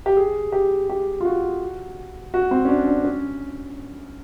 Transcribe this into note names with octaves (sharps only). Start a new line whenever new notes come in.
G4
G#4
G4
G4
F4
F#4
F#4
C4
C#4
D4
D4
C#4